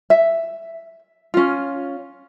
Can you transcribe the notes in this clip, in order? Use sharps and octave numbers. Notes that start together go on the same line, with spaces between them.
E5
C#4 F4